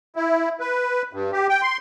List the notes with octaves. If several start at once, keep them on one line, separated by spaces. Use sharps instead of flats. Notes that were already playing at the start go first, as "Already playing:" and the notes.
E4
B4
G2
G4
G5
C6